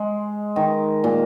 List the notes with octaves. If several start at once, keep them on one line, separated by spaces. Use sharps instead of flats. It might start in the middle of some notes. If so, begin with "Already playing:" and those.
Already playing: G#3
D#3
A#2